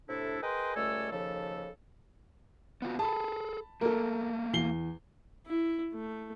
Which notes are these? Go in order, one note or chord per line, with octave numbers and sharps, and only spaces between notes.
A2 C3 D4 E4 A4
G#4 A#4 B4 D#5 G5 C6
C#2 G3 A3 A4 G#5 E6
D#2 C#3 F3 A4
B3 F4 F#4
G#4 A4 A5 B5
A3 A#3 A4 A#4
E2 C7 G7
E4
A3